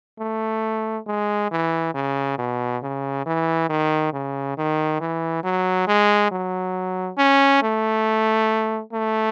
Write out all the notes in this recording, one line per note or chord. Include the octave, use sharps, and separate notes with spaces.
A3
G#3
E3
C#3
B2
C#3
E3
D#3
C#3
D#3
E3
F#3
G#3
F#3
C#4
A3
A3